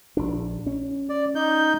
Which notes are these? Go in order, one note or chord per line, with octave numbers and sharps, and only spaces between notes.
A#1 D4
C#4
D5
D#4 G6